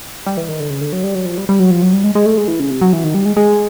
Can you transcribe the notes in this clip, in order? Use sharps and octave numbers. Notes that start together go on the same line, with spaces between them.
G3
E3
D#3
D3
C#3
D3
F#3
G3
F#3
F3
G3
G3
F#3
F3
F#3
G3
G#3
G#3
A3
G#3
E3
C#3
C3
F#3
E3
D#3
G3
G#3
G#3